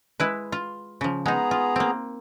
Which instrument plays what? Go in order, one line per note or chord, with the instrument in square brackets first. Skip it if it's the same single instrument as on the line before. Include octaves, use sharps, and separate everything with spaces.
[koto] G#3 E4 B4
F4
C#3 F3
[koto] G#3 D#4 [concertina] B3 G#4 A#5
[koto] F4
A#3 C4